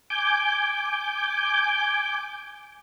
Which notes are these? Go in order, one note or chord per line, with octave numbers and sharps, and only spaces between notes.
G#5 D6 G6